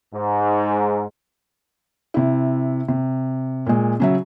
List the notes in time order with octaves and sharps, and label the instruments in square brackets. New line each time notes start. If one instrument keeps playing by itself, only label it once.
[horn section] G#2
[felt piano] C3 E4
C3
A#2 G#3
C#3 F#3 E5